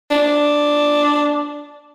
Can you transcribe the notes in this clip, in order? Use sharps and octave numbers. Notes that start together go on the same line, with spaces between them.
D4